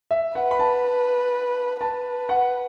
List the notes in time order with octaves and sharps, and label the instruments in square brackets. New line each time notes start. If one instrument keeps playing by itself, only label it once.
[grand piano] E5
[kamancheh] B4 [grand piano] F#5
[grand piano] B5
A5
[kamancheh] B4 [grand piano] A5
[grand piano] F#5